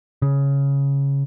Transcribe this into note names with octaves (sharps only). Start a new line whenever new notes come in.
C#3